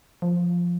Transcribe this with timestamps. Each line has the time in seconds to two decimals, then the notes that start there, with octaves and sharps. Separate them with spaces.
0.22 F3